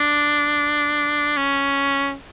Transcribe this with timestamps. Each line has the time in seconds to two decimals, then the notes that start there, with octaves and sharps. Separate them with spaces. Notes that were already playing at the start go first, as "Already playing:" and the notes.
Already playing: D4
1.37 C#4